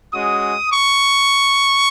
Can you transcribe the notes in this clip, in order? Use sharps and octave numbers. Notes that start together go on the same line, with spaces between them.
G#3 C#4 F#4 D#6
C#6